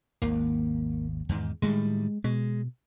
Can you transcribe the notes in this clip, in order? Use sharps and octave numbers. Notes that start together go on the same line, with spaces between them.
G#1 D#2 A#3
E2 G#2 D#3
A2 D#3 G3 G#3
B2 G#3